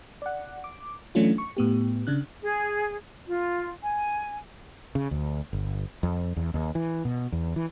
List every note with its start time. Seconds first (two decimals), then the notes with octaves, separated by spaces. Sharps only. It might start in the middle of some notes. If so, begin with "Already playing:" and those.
0.22 D5 F#5
0.64 D6
1.15 E3 F#3 A3 C#4 D4 F4
1.38 C#6
1.57 A2 B3 G4
2.07 C#3 D4 F#6
2.42 G#4
3.27 F4
3.83 G#5
4.95 C#3
5.11 D2
5.53 G1
6.03 F2
6.36 E2
6.54 D#2
6.75 E3
7.05 B2
7.32 E2
7.56 E3